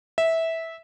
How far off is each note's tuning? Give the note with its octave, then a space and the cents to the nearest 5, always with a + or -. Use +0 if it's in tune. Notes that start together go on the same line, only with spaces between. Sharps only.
E5 -15